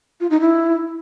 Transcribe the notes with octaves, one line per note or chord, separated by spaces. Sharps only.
F4
D#4
E4